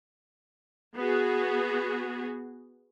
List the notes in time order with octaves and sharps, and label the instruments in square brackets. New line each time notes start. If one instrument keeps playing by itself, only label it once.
[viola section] B3 F#4 G#4